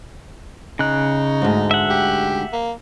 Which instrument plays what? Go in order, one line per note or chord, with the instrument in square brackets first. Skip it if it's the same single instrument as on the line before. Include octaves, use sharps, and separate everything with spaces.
[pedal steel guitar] C#3 F#6 [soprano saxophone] D#4
[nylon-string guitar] D2 G#2
[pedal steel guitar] E5 F#5
[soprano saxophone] G4
A#3